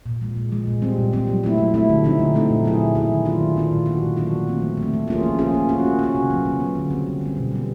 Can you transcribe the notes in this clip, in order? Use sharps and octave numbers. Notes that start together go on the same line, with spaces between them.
A#2
F3 G#3
A#2
F3 G#3
A#2
G3 C4
A#2
G3 C4
F#3
A3 C4 E4
F#3
A3 C4 E4
D3
F3 A3 C4 D#4
D3
F3 A3 C4 D#4
A#2
F#3 B3 E4 G#4
A#2
F#3 B3 E4 G#4
D#3
F#3 B3 D4 F4
D#3
F#3 B3 D4 F4
A#2
F#3 A#3 D4 F#4
A#2
F#3 A#3 D4 F#4
F3
A3 C4
F3
A3
C4
F3
A#3 C#4 F4 G#4
F3
A#3 C#4 F4 G#4
A#3
C#4 F#4
A#3
C#4 F#4
C#3
F#3 B3
C#3
F#3 B3
D3
G3 C4
D3
G3 C4
B2
G3 B3